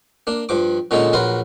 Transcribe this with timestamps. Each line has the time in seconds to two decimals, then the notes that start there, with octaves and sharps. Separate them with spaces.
0.27 A#3 D4
0.49 G2 F3 D6
0.91 A#2 D3 G#3 C#4 D#4 A4
1.13 A#1 F#3 A#4 B4 C6